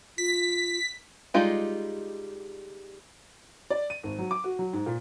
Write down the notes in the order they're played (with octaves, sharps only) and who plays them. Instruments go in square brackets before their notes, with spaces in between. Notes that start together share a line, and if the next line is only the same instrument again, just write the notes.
[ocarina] F4 [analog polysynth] B6
[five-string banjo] G3 G#3 D#4 F4 G4
[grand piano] D5
D#7
G#1
F#3
D6
F#4
F#3
G#2
A#2